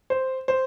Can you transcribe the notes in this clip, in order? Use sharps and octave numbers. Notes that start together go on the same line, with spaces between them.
C5
C5